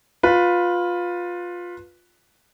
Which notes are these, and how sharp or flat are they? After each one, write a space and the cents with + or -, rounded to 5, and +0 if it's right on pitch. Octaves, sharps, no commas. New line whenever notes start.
F4 +15 B4 +0